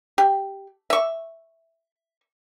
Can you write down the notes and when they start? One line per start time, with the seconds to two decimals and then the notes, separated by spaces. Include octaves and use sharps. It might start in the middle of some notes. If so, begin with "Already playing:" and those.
0.18 G4
0.90 E5 C#6